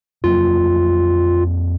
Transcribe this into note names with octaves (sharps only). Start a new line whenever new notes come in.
F2 F#3 A#3 F4